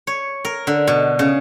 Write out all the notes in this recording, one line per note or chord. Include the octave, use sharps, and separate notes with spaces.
C#5
A#4
D3
B2
C#3